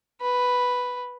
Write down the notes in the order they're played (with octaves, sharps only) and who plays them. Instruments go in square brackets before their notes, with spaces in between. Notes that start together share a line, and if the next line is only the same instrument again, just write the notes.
[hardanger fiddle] B4